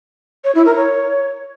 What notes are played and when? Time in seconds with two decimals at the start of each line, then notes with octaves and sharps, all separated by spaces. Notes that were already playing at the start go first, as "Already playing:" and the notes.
0.44 C#5
0.55 E4
0.65 A#4
0.76 C#5